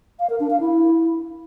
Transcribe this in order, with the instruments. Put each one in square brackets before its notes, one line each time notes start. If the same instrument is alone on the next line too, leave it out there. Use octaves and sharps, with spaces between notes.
[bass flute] F5
A#4
D4
F5
E4